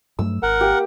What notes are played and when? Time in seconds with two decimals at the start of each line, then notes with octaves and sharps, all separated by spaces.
0.19 G2 F#3 A3 E6
0.43 G#1 A#4 F#5
0.61 A#3 G4